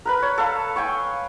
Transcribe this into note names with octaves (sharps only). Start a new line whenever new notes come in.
A#4 B4 B5
C#5
A4 F5
F5 G5 G#5 C#6